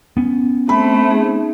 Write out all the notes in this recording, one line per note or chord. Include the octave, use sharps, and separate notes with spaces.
B3 C#4
A3 C4 B5
D#4 G#4